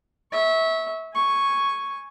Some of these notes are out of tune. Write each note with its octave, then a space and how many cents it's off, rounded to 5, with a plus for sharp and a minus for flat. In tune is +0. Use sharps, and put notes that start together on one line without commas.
E5 -25 C#6 +0
G#5 +0 C#6 +0